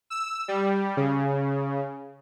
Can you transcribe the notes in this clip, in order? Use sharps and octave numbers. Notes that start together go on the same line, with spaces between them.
E6
G3
C#3